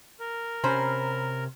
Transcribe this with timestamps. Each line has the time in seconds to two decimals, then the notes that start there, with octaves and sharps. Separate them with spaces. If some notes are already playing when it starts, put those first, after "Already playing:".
0.19 A#4
0.64 C3 C#4 C5 A#5 B5